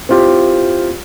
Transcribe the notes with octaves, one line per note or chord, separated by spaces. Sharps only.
C4 E4 F4 G4